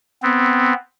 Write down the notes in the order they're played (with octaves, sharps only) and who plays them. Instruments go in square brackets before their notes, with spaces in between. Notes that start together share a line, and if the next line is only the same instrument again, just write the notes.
[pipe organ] B3 C4